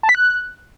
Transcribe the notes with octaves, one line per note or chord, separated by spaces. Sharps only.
A5
B6
F#6